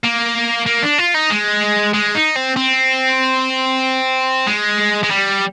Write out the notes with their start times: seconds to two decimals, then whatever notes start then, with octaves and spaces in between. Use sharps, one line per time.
0.04 A#3
0.66 A#3
0.83 D4
0.99 F4
1.15 D#4
1.30 G#3
1.94 G#3
2.15 D#4
2.36 C4
2.56 C4
4.47 G#3
5.03 G#3
5.10 G3